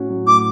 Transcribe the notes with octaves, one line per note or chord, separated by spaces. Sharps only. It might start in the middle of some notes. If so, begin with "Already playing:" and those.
Already playing: A2 C#4 F#4
F#3
A2 D6